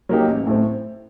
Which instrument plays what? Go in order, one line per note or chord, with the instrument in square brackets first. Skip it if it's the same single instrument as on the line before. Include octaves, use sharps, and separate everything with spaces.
[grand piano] F#3 A#3 D#4 G4
A1
A2 A3 C4